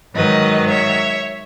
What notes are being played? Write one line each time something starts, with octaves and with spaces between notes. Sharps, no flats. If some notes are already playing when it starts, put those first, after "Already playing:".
G#2 D#3 F#3 B4 D#5
C#5 E5